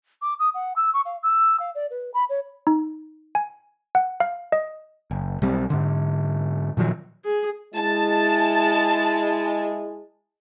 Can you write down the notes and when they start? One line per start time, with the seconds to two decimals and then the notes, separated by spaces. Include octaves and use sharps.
0.22 D6
0.39 D#6
0.54 F#5
0.76 E6
0.93 C#6
1.05 F5
1.23 E6
1.60 F5
1.75 D5
1.90 B4
2.14 B5
2.29 C#5
2.67 D#4
3.35 G#5
3.95 F#5
4.20 F5
4.52 D#5
5.11 F#1
5.42 B1 G3 C4
5.70 G#2 D3
6.77 A#2 D#3 F3 F#3
7.25 G#4
7.75 G#3 E4 A5